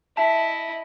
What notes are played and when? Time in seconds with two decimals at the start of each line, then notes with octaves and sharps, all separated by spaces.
0.17 E4 D#5 E5 A5